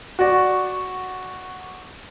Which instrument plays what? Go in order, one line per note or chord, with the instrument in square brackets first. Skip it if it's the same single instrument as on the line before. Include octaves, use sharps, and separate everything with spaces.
[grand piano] F#4 D5 [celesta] F#5 C#6